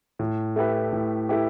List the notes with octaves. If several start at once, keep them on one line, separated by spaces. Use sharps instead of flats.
A2
A3 E4 G4 B4
A2
A3 E4 G4 B4